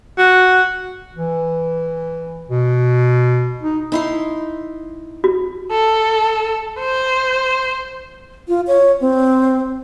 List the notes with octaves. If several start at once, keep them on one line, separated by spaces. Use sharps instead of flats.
F#4
E3
B2
D#4
D#4 E4 C6
F#4
A4
C5
F4
C#5
C4